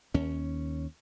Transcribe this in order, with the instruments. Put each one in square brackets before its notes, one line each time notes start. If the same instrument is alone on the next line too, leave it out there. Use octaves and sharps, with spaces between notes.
[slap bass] D#2 C#4